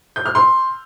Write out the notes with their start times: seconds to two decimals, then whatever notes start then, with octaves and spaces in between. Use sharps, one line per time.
0.16 G6
0.26 F6
0.35 C6